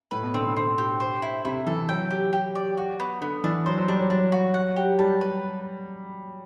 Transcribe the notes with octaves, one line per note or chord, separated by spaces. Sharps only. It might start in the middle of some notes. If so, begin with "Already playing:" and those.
A2 B4
B2
D3 C4
D3
D3 C4
G4
C5
E4
C3 E4
E3 A4
F#3 G5
G4
G4
D5
F#4
B3
D3 B3
E3 D4
F#3 C5
F#3
G3 D4
F#3
F#3 D4
F#4
F#5
G4
G3 A5
B4